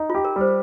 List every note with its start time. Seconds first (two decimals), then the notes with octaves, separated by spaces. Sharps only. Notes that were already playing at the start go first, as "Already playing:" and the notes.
Already playing: D#4
0.10 F4 G4
0.25 A#4
0.36 G3 C5